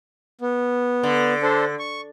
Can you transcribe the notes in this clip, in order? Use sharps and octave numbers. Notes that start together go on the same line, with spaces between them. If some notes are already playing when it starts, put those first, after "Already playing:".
B3
D3
D4 A4 C5
C#6